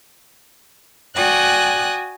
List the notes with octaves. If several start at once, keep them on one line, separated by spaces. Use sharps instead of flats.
F#4 D5 G5 G#5 D#6 F#6